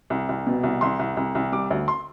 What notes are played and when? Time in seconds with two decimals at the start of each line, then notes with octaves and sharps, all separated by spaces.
0.10 C2
0.29 C2
0.46 B2
0.63 C2
0.81 C2 C6
0.99 C2
1.17 C2
1.35 C2
1.52 G3 D6
1.70 D2
1.88 C6